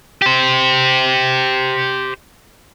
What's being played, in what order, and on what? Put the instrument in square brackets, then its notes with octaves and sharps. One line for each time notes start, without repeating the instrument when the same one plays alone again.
[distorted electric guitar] G4 C5